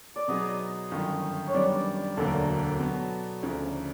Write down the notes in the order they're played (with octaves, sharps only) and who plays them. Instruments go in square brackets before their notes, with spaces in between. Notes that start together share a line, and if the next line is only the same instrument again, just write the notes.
[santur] D5
[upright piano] B2 F#3 B3 D#4 G#4 [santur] D#5
[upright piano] G1 F#2 D#3
[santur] C#5
[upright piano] F#2 D#3 G3 B3 D4 [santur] D5
[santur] D5
D5
[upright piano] E1 D2 D3 F#3 A#3 [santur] A4
[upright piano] B2 F#3 B3
[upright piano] D2 C#3 F3 [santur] A#4